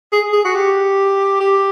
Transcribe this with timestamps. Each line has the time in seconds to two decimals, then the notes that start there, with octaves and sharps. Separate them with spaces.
0.12 G#4
0.32 G#4
0.45 F#4
0.55 G4
1.40 G4